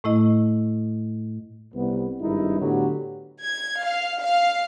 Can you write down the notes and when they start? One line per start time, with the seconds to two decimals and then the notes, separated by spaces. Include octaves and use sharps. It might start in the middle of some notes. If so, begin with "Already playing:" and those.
0.04 A2 A3 E4 D#5
1.74 C2 B3
2.21 G#1 G2 D#4 E4
2.59 A2 D3 F#3 B3 F#4 G4
3.41 G#6
3.82 F5
4.20 F5